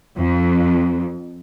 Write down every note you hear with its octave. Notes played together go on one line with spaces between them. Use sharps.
F2